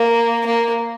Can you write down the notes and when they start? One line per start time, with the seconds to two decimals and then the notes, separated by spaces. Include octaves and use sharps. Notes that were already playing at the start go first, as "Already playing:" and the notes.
Already playing: A#3
0.46 A#3